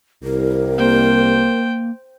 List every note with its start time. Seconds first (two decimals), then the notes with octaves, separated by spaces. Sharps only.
0.24 C2 A#4
0.78 A#3 C5 G5